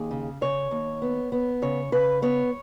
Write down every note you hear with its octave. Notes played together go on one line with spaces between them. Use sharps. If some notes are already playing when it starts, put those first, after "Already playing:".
Already playing: D#2 G#4
C#3
C#3 C#5
D#2
B3
B3
C#3 C#5
C#3 B4
B3 C#5